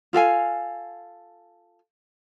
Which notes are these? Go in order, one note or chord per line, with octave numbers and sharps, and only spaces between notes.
F4 A4 F5 G#5